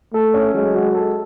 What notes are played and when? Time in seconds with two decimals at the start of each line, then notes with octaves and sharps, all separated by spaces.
0.13 A3 A4
0.34 C#4
0.54 F#3 G#3
0.75 F#4
0.95 A4